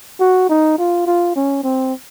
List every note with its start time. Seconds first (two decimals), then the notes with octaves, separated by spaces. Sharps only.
0.20 F#4
0.49 D#4
0.78 F4
1.06 F4
1.35 C#4
1.63 C4